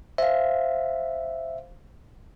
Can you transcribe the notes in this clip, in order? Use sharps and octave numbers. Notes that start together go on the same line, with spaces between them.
C5 E5 F5